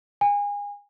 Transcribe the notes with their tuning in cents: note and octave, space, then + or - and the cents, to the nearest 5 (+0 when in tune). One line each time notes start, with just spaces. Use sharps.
G#5 -30